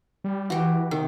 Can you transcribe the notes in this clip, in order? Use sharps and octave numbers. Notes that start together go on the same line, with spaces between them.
G3
E3 F#4 G4
C3 D#3